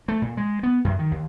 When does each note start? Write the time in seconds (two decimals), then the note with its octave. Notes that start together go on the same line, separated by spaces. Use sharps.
0.08 A3
0.22 A#2
0.37 G#3
0.63 B3
0.84 F#2
0.99 D#3
1.11 D#2